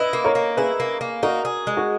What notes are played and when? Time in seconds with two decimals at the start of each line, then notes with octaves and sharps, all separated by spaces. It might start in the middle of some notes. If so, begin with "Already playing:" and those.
Already playing: E4 B4 D#5
0.13 A#3
0.25 A#4 C#5
0.35 A#3
0.57 E4 G#4 B4
0.80 A#3
1.01 A#3
1.23 D#4 F#4 A#4
1.45 G#4
1.67 G#3
1.77 F#4